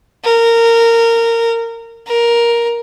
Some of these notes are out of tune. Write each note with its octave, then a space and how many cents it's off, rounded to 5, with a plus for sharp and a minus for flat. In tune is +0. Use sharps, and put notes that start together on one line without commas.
A#4 -20
A#4 +10